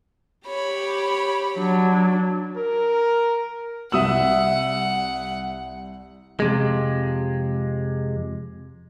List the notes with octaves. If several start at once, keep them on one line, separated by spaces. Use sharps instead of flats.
G4 C#5 B5
F#3 D4
A#4
C2 E5 F#5 D#6 E6 F#7
F2 C3 G#3